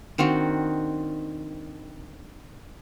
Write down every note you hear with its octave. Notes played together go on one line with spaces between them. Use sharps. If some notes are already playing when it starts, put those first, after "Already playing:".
D#3 C4 D4 F#4